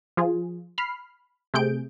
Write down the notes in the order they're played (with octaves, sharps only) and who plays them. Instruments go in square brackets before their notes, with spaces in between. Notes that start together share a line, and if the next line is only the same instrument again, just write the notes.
[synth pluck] F3 F4 G#4
B5 F6 C7
C3 A3 G#4 G6 D7